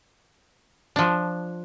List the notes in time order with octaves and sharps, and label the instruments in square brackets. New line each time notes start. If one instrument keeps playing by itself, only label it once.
[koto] F3 D4